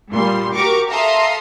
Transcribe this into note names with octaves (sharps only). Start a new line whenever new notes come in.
A#2 G3 C6
F#4 G4 A#4 A#5 C#6 D6
A4 E5 F5 A#5 C6 D#6